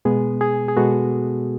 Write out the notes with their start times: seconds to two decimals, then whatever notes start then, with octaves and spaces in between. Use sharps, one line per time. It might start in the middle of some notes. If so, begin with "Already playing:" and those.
0.05 B2 G#3 B3 G#4
0.41 G#4
0.68 G#4
0.76 B2 G#3 B3 F#4 A4